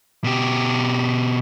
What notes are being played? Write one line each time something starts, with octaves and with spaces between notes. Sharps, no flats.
B2 G4